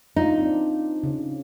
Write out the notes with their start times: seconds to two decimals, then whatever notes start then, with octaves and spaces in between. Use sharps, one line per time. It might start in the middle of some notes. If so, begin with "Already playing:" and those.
0.16 D4 D#4 F4
0.38 C4 D4
1.03 C#3